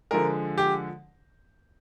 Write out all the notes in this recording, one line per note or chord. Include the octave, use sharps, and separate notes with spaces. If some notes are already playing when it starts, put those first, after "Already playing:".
D3 F3 G#3 A#4
G4